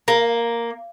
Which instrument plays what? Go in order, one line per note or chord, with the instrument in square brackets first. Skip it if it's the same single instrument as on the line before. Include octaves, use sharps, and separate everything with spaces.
[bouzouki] A#3